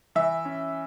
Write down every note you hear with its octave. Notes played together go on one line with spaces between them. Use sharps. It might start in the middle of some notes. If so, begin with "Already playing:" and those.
E3 E5
C#4